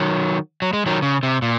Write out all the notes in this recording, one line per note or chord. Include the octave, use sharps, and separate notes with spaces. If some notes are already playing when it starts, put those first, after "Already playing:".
Already playing: D#3 F#3
F#3
G#3
D#3 F#3
C#3
C3
A#2